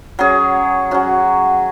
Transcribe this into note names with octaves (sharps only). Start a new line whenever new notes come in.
F#3 C#4 G#4
F#3 C#4 F#4